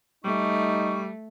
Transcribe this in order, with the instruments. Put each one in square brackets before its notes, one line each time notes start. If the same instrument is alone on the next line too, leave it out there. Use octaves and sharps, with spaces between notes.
[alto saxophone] G3 [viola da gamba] A3 [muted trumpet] D#4 [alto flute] C#6